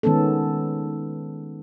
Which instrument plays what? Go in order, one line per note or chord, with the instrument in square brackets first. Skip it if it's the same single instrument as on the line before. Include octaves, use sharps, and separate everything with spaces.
[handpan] D#3 G#3 B3 C#4 A4